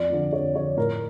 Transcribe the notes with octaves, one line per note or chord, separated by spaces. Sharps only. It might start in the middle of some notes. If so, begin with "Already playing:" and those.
Already playing: F2 D5
D3 F3
F2 C#5
D3 F3 C#5
A2 A#4